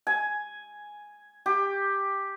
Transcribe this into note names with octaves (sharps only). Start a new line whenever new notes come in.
G#5
G4